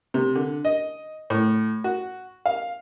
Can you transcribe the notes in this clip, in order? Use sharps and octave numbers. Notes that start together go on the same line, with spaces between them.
C3
D3
D#5
A2
F#4
F5